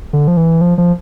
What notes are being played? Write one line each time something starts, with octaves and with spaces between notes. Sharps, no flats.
D3
F3
E3
F3
F3